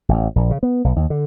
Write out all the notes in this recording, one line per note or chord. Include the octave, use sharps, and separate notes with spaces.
A1
A#1
C#3
B3
B1
D#2
D3